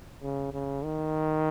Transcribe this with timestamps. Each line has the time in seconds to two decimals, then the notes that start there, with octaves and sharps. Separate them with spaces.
0.22 C#3
0.53 C#3
0.84 D#3